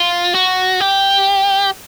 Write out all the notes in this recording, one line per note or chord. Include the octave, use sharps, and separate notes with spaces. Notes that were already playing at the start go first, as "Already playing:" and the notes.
Already playing: F4
F#4
G4